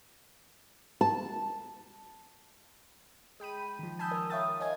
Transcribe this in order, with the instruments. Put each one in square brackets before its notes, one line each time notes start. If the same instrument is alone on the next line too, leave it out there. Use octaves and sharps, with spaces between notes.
[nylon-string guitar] A5
[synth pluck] G#3 G5 B5 D#7
D#3 F3
G#5 A5 B5 D#6 E6 G6
A#4
C#5 E5 F5 G5 D#6 A6
C#5 D#5 F5 G5 G#5 G#6